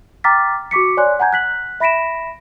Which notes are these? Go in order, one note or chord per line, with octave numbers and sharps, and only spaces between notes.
G5 A#5 D6 F6 A6 B6
F#4 C#6 D6 B6 C#7
C#5 D5 G#5 C6 F#6
F#5 G#5 A#5 G6 G#6
F#6 B6 F#7
E5 B5 A#6 B6 D7 E7